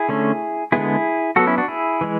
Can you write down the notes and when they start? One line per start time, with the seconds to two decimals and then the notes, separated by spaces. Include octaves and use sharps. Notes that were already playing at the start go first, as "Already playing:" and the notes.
Already playing: E4 G#4
0.09 D3 A3 C#4
0.72 D3 G#3 B3 E4 G#4
1.36 F#3 B3 F#4 A4
1.47 C#4 E4
1.58 D4 F#4
1.68 E4 G#4
2.01 E3 G#3